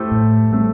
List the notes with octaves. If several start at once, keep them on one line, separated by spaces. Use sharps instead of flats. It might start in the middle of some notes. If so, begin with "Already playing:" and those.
Already playing: A3 E4 G4 A4 C5
A2
G3 A3 C4 A4